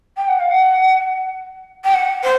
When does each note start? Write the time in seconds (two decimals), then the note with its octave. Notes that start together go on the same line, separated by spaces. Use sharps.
0.17 G5
0.28 F#5
0.40 F5
0.51 F#5
1.84 G5
1.94 F#5
2.23 C5